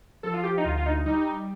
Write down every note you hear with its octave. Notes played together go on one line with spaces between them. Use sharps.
F3 A4
F4
G4
D#4
D2 F4
F4
D#4
G3 D#4